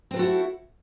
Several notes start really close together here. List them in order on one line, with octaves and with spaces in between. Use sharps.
C4 B4 A4 F#4 E4